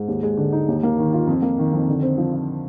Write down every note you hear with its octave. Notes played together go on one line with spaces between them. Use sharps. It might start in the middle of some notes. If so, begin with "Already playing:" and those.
Already playing: G#2
D#2
G#3
D3
D#4
D#2
A#3
D#3
F4
F2
A#3
D#3
F2
D3
C4
F3
F4